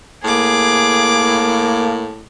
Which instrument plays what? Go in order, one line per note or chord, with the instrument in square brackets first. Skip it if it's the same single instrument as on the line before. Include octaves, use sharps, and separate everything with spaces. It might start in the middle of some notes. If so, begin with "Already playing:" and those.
[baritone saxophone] A2 [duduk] A#3 [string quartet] G#4 D6